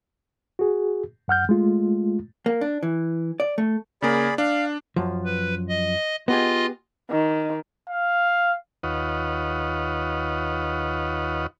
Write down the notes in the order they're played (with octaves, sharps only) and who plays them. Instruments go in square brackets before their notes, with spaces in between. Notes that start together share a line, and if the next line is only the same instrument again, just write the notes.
[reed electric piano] F#4 G#4
F#2 F#5 F6 G6
G#3 A3 F4
[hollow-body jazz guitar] A#3
D4
E3
D5
A3
[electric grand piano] C#3 A#3 [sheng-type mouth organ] G#4 D5 B5
[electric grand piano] D4 [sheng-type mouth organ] F5
[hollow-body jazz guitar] F#2 F3
[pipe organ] B4
D#5
[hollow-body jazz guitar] B3 G4 G#4 [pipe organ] F4 D#5
[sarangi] D#3
[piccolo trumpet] F5
[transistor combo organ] D#2 F4 B4 C#5 D#5 F#5